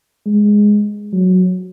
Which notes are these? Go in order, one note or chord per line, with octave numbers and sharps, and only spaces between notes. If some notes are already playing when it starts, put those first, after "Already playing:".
G#3
F#3